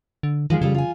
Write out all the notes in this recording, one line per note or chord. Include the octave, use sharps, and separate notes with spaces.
D3
D#3 F3 G#3 G#4
C#3 G3 F4 A4
F4 G#5